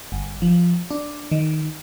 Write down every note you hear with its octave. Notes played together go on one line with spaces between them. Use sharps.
G1
F3
D4
D#3